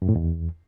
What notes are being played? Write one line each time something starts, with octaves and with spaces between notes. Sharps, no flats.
F#2
A2
E2